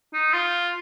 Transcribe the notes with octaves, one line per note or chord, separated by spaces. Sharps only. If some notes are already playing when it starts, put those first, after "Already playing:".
D#4
F4